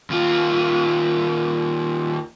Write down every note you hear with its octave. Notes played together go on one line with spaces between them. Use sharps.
D#2 F4